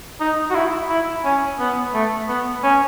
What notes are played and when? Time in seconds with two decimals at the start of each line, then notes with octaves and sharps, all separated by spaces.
0.20 D#4
0.50 F#4
0.55 E4
0.90 E4
1.24 C#4
1.59 B3
1.94 A3
2.28 B3
2.63 C#4